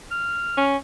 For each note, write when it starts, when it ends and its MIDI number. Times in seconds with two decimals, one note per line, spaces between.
0.11 0.64 89
0.57 0.77 61